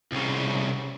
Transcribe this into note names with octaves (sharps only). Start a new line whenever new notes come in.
C2 C#3